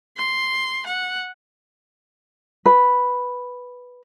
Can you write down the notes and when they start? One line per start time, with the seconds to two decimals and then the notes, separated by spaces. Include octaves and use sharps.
0.17 C6
0.86 F#5
2.66 B4